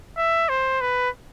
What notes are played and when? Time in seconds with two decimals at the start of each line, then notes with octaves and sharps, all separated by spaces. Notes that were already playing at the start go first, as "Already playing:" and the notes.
0.17 E5
0.49 C5
0.81 B4